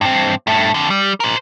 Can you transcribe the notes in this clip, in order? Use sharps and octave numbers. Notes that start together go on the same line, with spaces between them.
G2 C4
G2 A3
F2 D3
G3
A#4 C5